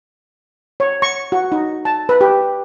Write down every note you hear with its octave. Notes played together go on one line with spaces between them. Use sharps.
C#5
C#6
F#4
D#4
A5
B4
G4